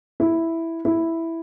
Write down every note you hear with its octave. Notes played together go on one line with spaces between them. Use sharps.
E4
E4